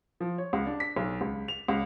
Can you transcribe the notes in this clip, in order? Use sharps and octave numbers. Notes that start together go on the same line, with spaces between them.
F3
C#5
C#2
D4
B6
B1
C#2
F7
C#2